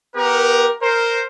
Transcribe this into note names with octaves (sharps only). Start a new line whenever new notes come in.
B3 G4 A#4
A#4 C5